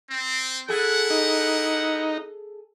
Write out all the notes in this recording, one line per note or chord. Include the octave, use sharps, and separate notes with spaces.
C4
E4 G#4 A4 F#5
D#4